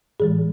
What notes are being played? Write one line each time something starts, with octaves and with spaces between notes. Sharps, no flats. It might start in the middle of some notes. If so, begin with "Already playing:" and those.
A2 E3 G#3 G#4